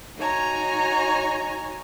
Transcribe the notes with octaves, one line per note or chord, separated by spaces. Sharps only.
D#4 F#4 C#5 G#5 A#5